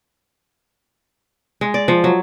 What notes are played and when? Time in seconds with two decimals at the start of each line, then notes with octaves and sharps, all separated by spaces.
1.61 G#3
1.74 D5
1.88 F3
2.04 F#3